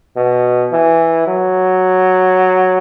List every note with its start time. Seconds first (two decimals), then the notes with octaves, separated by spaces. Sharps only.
0.17 B2
0.72 E3
1.27 F#3